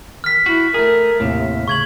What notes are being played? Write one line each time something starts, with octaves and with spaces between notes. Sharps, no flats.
D#3 F6 B6
E4 F#4
A3 G#4 A#4
D#2 A2 C3
C#3 C#6 G#6 F#7